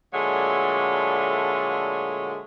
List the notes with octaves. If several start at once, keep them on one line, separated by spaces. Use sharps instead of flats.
A#2 D3 F#3 G#3 A3